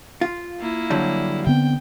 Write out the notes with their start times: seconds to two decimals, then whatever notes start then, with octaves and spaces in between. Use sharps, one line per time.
0.21 F4
0.60 A#3 E4
0.90 D3 F#3 G3
1.47 D3 B3 C4 G5